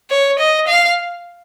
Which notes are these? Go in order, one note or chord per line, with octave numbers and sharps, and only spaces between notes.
C#5
D#5
F5